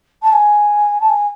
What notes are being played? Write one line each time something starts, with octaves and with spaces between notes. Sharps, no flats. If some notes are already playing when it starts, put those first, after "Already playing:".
A5
G#5
A5
G#5